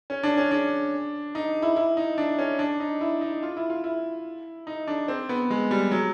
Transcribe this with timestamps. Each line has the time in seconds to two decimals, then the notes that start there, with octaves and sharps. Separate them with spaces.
0.10 C#4
0.23 D4
0.37 C#4
0.51 D4
1.35 D#4
1.62 E4
1.76 E4
1.97 D#4
2.18 D4
2.38 C#4
2.59 D4
2.80 D#4
3.01 E4
3.21 D#4
3.43 F4
3.57 E4
3.70 F4
3.84 E4
4.67 D#4
4.88 D4
5.08 C4
5.29 B3
5.50 G#3
5.71 G3
5.91 F#3